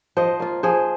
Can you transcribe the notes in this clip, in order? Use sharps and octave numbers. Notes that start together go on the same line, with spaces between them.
F3 C5 D#5
A#3 F4
F3 G#4 C5